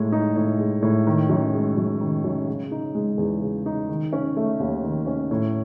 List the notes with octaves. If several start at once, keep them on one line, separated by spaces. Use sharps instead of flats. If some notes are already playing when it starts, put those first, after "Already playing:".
Already playing: A2 G#3
D#4
A2
G#3
A2
D#3
F#2
G#3
F#2
D#3
F#2
C#3
D#4
G#3
E2
C#3
D#4
D#3
C#4
A3
D#2
D#3
C#4
A2